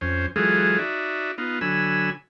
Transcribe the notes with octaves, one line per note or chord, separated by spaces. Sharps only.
F2 C#4 C5
E3 F#3 G#3 F4 G#4 A4
D#4 F#4 D5 E5
B3 D#4 F4
D3 F#3 G#5 B5 E6